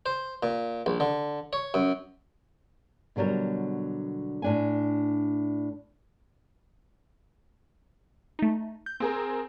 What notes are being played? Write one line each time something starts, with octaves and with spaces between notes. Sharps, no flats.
C5
A#2
A#1
D3
C#5
F#2
B2 D3 F#3 G3 A#4
A2 D4 G#5
A3 D#4
G6
C4 G#4 A#4